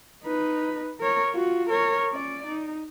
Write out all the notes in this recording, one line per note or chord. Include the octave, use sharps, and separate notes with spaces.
D#4 B4
A#4 C#5
F4 F#4
A#4 C#5
C#4 D5
D#4